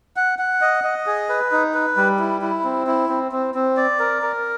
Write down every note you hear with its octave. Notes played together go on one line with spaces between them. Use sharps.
F#5
F#5
D#5
D#5
G#4
B4
D#4
B4
G3
E4
E4
C4
E4
C4
C4
C4
D5
A#4
A#4